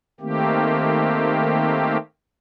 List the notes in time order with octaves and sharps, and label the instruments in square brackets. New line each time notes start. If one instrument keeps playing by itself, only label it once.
[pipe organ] D#3 A3 A#3 C4 G4